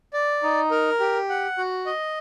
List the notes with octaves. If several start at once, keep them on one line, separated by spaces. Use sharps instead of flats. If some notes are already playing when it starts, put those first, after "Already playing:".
D5
D#4
A#4
G4
F#5
F#4
D#5